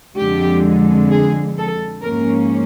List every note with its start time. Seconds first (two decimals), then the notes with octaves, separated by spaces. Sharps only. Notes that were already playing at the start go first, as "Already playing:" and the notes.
0.18 F2 D3 F3 G#3 G4
1.11 G#4
1.57 A4
2.03 G#2 F3 A#3 C#4 A#4